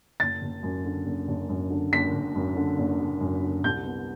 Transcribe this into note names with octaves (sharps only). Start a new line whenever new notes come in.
F#1 A6
F#1
F#2
D3
F#1
F#1
F#2
D3
F#1 B6
F#1
F#2
D3
F#1
F#1
F#2
D3
C2 G6
B3